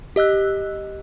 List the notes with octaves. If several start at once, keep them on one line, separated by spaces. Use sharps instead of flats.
G4 D#5 E6 F#6